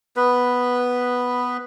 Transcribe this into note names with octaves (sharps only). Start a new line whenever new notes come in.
B3 B4